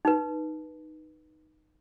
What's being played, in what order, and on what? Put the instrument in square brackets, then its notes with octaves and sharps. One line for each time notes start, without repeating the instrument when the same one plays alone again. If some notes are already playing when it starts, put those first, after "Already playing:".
[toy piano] D#4 B4